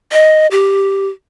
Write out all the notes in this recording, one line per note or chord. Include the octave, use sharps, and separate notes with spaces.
D#5
G4